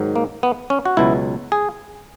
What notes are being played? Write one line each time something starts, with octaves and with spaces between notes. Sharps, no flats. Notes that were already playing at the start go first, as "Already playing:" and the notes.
Already playing: G#2 D#3 F#3
A#3
B3
C#4
F#4
C#2 B2 F#3 E4
G#4